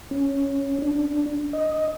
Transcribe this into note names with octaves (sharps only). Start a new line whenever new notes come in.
C#4
D4
D#5